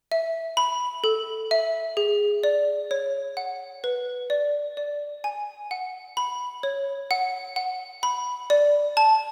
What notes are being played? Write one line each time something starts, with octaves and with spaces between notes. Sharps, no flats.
E5
B5
A4
E5
G#4
D5
C#5
F#5
B4
D5
D5
G#5
F#5
B5
C#5
F#5
F#5
B5
D5
A5